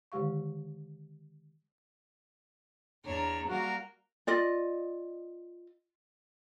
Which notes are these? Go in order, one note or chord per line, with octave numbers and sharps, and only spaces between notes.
D3 D#3 G#3 G4 F5 C#6
E2 D4 C#5 A#5
G3 A#3 F#4 A#4
F4 D5 D#5